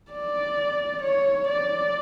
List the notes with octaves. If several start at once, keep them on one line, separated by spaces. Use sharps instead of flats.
D5
C#5
D5